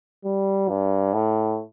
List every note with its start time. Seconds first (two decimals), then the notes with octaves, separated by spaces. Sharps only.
0.24 G3
0.69 G2
1.14 A2